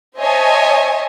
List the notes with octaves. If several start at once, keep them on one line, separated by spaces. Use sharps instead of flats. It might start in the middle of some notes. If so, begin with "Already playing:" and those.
C5 C#5 D#5 E5 G#5 A5